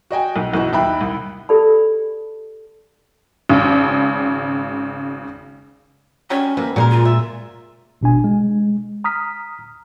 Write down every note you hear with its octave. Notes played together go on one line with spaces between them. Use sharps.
F#4 D#5 G5 G#5
B1
F#1 B1 E3 F#4
D#2 E5 G5 B5 F#6
C2
G4 A4 D5 A5 B5
G#1 C#3
F#3 G3 C#4 C#5
C3 A#3 B4
A#2 G#3 F#4 G#4 A#4
F4
E5
G#1 B2 D4 G#5
G#3
A#5 D#6 F6 B6